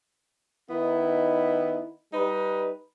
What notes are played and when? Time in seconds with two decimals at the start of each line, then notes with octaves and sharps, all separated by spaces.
0.70 D#3 B3 D#4 E4
2.14 G3 D#4 B4